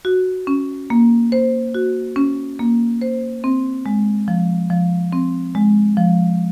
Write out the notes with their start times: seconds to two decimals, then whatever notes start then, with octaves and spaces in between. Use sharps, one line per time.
0.05 F#4
0.47 C#4
0.90 A#3
1.32 C5
1.74 F#4
2.16 C#4
2.59 A#3
3.01 C5
3.44 C4
3.86 G#3
4.28 F3
4.70 F3
5.12 C4
5.55 G#3
5.97 F3